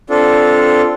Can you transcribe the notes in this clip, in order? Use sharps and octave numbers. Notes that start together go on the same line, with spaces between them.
C4 D4 F4 A4